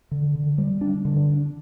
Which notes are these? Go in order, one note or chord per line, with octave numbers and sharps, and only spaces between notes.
D3
D3
G3
D4
D3
D4